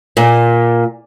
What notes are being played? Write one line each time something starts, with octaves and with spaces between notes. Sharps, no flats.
A#2